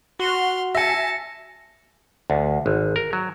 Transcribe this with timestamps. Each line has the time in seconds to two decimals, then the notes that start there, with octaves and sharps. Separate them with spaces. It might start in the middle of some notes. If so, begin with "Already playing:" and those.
0.20 F#4 C6 F6
0.75 E5 G#5 A5 A#6 C#7
2.30 D2
2.66 G#1
2.96 A#4
3.13 F#3